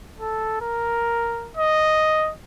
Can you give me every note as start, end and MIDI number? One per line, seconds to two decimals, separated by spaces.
0.20 0.57 69
0.61 1.51 70
1.57 2.31 75